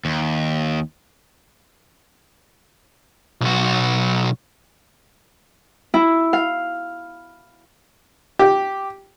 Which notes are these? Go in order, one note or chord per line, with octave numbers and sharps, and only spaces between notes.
D#2
B1 F#4
E4
F5
G4